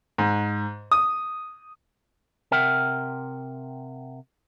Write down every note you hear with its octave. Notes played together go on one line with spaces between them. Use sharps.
G#2
D#6
C3 A#4 E5 F#5 G5